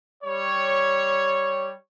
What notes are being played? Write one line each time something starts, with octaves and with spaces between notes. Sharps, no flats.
G3 C#5